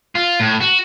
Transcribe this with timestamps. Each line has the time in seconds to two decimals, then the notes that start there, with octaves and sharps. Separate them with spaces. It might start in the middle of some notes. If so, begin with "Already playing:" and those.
0.15 F4
0.40 A2
0.61 F#4